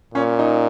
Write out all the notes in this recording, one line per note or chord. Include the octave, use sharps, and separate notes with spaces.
A#2 C#4
D#4